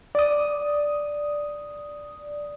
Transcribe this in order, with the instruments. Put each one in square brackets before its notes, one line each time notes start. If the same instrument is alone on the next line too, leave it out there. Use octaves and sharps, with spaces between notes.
[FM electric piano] D5 D#6